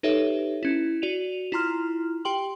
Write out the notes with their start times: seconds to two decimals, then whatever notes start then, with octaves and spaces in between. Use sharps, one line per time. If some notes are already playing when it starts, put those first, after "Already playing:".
0.03 D#4 G4 A4 B4 C#5 E5
0.63 C#4 E4
1.02 F#4 D5 D#7 F7
1.52 E4 F4 A#5 C6 F6
2.25 G4 G5 C6 F#7